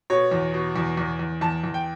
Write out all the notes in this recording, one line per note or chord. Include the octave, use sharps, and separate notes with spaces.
B2 C#5
E2
B2
E2
E2
E2
E2 A5
E2
G5